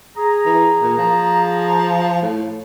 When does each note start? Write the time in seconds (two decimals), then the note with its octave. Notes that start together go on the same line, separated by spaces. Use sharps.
0.17 G#4 A#5
0.45 E3
0.82 A#2
0.98 F3
2.22 A2